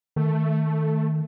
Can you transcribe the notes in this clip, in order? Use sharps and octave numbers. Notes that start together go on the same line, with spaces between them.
D#3 A3